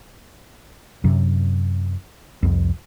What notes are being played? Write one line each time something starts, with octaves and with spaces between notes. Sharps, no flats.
F#2 C3 F#3
C2 F2